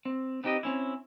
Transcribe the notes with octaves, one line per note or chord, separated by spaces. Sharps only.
C4
B3 C4 D#4 G4 B4 D#5
C4 C#4 E4